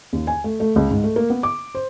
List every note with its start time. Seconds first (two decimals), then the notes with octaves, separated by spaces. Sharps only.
0.13 D#2
0.27 G#5
0.44 A3
0.60 A3
0.76 C#2
0.90 G#2
1.04 A3
1.16 A#3
1.30 B3
1.43 D6
1.75 C5